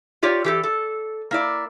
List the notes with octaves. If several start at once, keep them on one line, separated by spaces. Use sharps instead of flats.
F4 G4 C#5 D5
E3 G4 A4
A4
A#3 E4 D5